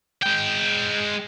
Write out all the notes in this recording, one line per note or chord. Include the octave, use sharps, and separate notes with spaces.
G#3 G5